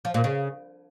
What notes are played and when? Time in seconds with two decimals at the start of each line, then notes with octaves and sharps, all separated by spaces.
0.05 F3
0.14 A#2
0.24 C#3